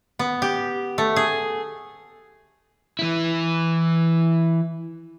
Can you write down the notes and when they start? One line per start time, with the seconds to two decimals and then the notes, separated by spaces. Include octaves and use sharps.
0.19 B3
0.42 G4
0.98 A3
1.16 G#4
2.99 E3 E4